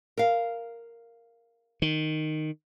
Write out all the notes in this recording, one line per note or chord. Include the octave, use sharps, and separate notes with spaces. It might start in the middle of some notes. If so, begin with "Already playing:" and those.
A#4 F5
D#3